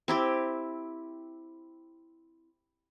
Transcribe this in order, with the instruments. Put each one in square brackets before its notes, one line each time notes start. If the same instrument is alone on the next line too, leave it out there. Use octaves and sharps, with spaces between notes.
[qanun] C4 E4 G4